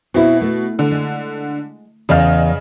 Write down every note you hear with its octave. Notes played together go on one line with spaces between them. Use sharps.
B2 C4 E4
A3
D3
G#3
E2 C#3 D5 D#5 F5 F6